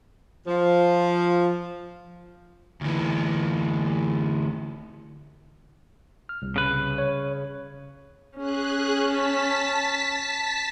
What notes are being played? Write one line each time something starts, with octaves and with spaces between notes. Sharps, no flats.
F3
D2 E3
F6
C2
C#3 B4
C#5
C#4 G#4 F#6
A5 B6